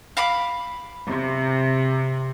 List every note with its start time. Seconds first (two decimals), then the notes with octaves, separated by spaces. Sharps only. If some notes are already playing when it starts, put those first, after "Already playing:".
0.17 F5 B5 D6
1.08 C3